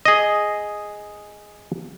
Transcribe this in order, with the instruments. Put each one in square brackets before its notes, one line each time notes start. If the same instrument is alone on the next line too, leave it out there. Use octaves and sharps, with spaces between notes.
[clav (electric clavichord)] G#4 D#5